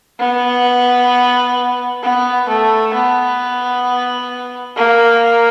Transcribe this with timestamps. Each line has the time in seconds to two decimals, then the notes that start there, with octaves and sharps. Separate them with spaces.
0.19 B3
2.03 B3
2.49 A3
2.94 B3
4.76 A#3